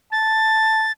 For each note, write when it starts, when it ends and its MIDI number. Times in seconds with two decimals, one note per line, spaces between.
0.12 0.88 81
0.12 0.92 93